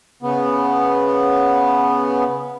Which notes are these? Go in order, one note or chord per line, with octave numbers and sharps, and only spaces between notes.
C#3 B3